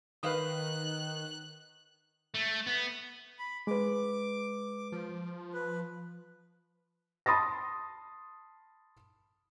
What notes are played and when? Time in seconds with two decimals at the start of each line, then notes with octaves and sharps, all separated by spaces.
0.23 D#3 B4 F5 D#6 F#6
2.34 A3
2.67 B3
3.39 B5
3.67 G#3 B4 D6
4.92 F3
5.54 B4
7.26 A5 B5 C6 D#6 A6 A#6